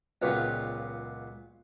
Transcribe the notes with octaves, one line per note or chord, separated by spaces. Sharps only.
C#2 A#2 F#3 B3 G4